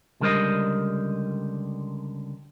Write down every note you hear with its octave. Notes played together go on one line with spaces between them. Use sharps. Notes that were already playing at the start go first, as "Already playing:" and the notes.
C#2 D3 G3 A#4 C5 D#5